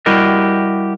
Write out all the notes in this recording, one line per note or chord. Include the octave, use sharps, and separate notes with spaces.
G3 E4 F#4 G4 A#4 D#5